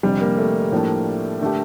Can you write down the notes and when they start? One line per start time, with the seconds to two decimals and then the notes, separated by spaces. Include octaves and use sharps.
0.03 F1 F2 D3 G3
0.21 A#3
0.38 A3
0.72 A2 F3 A#3 D4
1.42 D3 A3 D4 G4